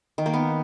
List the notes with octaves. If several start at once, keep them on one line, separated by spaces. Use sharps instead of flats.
D#3
A#3
B3